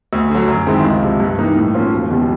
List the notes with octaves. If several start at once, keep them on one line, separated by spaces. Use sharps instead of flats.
D2
D3 F#3
F#2
D#3 G#3 C4 E4
C#2
C3 F3
G2
E3 G3 A#3 D#4
A2
F3 A#3 C#4 F4
E1
E2 B2 G3